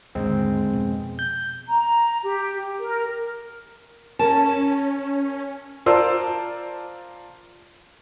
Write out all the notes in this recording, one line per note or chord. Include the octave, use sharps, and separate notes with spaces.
D#2 G#2 D3 G#3 C4
F2 B2
G6
A#5
G4
A#4
C#4 A#4 A5
F4 A#4 C5 D5 A5 E6